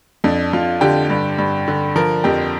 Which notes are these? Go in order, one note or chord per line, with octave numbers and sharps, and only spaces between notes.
F2 D4
F2 F4
D3 G4
G2
G2
D3
F3 A#4
F2 G4